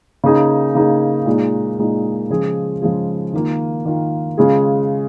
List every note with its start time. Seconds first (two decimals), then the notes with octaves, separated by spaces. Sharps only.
0.24 C#3 A#3 D#4 G#4
0.75 C#3 A#3 D#4 G#4
1.26 A#2 G#3 D#4
1.78 A#2 G#3 D#4
2.30 C#3 F3 G#3 F4 G#4
2.82 C#3 F3 G#3 F4 G#4
3.33 D#3 A#3 F4
3.85 D#3 A#3 F4
4.38 C#3 G#3 F4 G#4